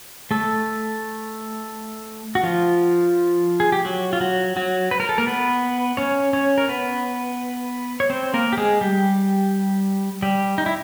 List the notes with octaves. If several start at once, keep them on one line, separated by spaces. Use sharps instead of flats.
A3 A4
F#4
F3 F4
G#4
G4
F#3 F#4
F4
F#3 F#4
F#3 F#4
B4
A#4
A4
A#3 A#4
B3 B4
C#4 C#5
C#4 C#5
A#4
B3 B4
C#5
C4 C5
A#3 A#4
G4
G#3 G#4
G3 G4
G3 G4
D#4
E4